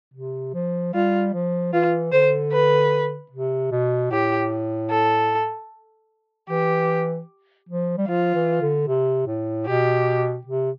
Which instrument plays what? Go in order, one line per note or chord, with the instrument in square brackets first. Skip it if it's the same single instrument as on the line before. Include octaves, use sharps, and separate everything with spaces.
[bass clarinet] C3
F3
[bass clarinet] G3 [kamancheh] F4
[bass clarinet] F3
[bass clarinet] E3 [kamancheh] F4
[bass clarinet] D3 [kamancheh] C5
[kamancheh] B4
[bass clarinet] C3
B2
[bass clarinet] A2 [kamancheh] G4
[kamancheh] A4
[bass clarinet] E3 [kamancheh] G4
[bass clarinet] F3
G3
[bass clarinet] F3 [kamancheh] F4
[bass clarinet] E3
D3
C3
A2
[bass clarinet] B2 [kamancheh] G4
[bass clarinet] C3